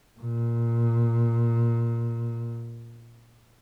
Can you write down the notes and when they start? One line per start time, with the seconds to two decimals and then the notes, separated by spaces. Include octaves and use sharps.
0.19 A#2